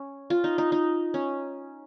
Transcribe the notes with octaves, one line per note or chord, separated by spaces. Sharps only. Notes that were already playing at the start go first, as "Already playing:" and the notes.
Already playing: C#4
F4
D#4
D#4
D#4
C#4